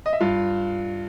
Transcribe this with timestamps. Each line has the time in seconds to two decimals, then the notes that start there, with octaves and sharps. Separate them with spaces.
0.06 D#5
0.13 E5
0.21 G2 F4 F5